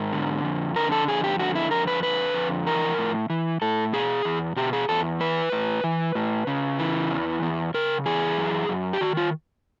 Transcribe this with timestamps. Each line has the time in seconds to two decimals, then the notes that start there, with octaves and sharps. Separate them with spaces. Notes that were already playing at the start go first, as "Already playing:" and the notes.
Already playing: G#2 A#4
0.13 D3
0.44 F2
0.76 D3 A#4
0.92 A4
1.08 F2 G#4
1.24 G4
1.39 D3 F#4
1.55 E4
1.71 F2 A#4
1.88 B4
2.03 D3 B4
2.34 F2
2.67 E3 A#4
2.98 A2
3.30 E3
3.62 A2 A4
3.93 B2 G#4
4.25 E2
4.56 B2 G4
4.73 G#4
4.89 E2 A4
5.20 E3 B4
5.52 A2
5.84 E3
6.15 A2
6.47 C#3
6.79 E3
7.11 E2
7.42 E2
7.74 C#3 A#4
8.06 E3 G#4
8.37 F#2
8.69 F#2
8.93 G4
9.01 D#3 F#4
9.17 F4